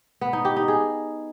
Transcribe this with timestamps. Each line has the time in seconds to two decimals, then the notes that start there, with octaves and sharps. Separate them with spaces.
0.21 B3
0.33 D#4
0.45 G4
0.56 D#4
0.68 G#4